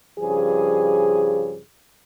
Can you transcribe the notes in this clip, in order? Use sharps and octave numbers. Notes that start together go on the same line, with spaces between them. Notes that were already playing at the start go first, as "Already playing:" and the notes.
G2 C#3 F3 G#4